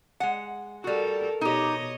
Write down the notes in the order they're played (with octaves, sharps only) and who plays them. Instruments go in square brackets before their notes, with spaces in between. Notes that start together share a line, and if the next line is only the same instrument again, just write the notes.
[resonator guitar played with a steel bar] G#3 F#5
[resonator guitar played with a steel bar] G3 F#4 [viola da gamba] A4 A#4
[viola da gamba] B2 C#5 D#5 [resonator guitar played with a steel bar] D#4 G4